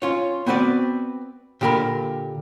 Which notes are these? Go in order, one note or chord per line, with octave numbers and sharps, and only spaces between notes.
C#4 F4 C#5
B3 C4 F#4 B4 D5
A#2 D3 G4 G#4 A#4 B5